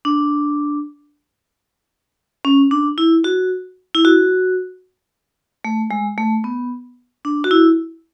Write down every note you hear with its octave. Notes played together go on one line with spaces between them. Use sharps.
D4
C#4
D4
E4
F#4
E4
F#4
A3
G#3
A3
B3
D4
F#4
E4